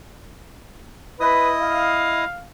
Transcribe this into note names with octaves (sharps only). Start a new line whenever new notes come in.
E4 B4 D#5 D#6
F5